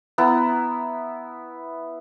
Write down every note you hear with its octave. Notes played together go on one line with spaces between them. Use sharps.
B3 E4 A#5